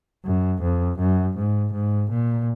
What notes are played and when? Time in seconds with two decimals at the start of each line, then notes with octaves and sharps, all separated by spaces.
0.25 F#2
0.62 F2
0.99 F#2
1.37 G#2
1.73 G#2
2.11 A#2